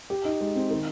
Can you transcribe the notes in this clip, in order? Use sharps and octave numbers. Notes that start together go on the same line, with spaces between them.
G4
D#4
G#3
C4
D#3